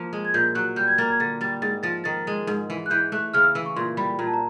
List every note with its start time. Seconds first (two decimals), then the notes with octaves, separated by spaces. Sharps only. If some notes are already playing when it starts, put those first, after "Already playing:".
Already playing: F3 A#3
0.13 G#3
0.25 G#6
0.34 A#2 G6
0.55 F#3 F#6
0.76 G3 G6
0.87 G#6
0.98 A#3 A6
1.09 G#6
1.20 D3 A6
1.41 G3 A6
1.62 G#2 A6
1.83 F3 A6
2.04 D#3 A6
2.27 G#3
2.47 G#2
2.70 E3
2.86 F#6
2.90 E3 G6
3.12 A3 F#6
3.34 C#3 F6
3.44 E6
3.55 E3 E6
3.66 C#6
3.76 A#2 C6
3.97 G3 B5
4.19 A#2 A#5
4.27 A5
4.33 A#5